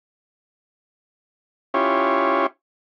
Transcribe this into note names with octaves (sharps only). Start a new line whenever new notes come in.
C#4 E4 F4 G4 C#5